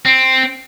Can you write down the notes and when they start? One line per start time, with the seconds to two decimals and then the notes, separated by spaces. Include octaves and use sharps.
0.05 C4